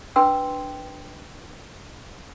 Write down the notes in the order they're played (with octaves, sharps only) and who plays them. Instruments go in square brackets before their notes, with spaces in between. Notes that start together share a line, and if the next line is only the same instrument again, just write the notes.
[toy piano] D4 B4 G5 C6 E6